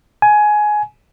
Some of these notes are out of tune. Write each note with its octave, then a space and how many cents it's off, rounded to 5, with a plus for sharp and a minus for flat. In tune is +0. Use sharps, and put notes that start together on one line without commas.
G#5 +15